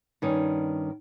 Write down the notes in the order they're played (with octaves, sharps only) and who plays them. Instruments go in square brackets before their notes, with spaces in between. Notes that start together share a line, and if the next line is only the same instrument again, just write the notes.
[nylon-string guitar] G2 D#3 C#4